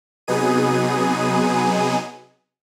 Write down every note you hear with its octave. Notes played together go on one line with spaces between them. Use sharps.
C3 F#3 B3 D#4 G#4 D#7